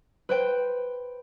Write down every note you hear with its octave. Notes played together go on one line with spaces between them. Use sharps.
B4 C5 G5